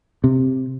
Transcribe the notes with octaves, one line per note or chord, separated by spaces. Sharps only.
C3